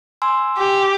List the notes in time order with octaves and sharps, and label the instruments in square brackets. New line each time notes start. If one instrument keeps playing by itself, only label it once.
[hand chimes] G#5 C6 E6
[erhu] G4